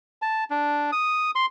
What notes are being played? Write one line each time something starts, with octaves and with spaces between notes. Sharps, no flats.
A5
D4
D#6
C6